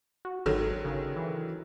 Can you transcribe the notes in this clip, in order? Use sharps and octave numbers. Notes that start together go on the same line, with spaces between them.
F#4
G#1 D3 D#3 F#3
C#3
E3